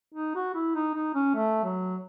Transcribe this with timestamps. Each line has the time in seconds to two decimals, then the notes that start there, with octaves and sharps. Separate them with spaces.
0.14 D#4
0.35 F#4
0.54 E4
0.75 D#4
0.94 D#4
1.15 C#4
1.35 A3
1.64 F#3